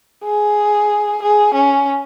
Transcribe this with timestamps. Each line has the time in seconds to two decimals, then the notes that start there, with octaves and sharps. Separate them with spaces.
0.25 G#4
1.23 G#4
1.54 C#4